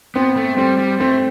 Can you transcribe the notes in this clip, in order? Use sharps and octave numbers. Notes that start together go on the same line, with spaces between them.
B3 C4
A3
G3 C4
G3
A3 C4